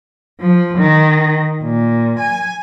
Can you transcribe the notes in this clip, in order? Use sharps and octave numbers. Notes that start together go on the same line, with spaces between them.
F3
D#3
A#2
G#5